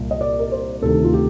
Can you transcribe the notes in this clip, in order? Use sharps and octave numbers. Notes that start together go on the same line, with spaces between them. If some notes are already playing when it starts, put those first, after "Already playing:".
Already playing: C2 A#2
D#5
D5
A#4
C5
D2 C3 D#3 A4
F4
G4